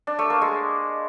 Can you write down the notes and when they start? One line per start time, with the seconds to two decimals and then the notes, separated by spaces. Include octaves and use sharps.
0.07 D4
0.19 A3
0.30 A#3
0.41 G#3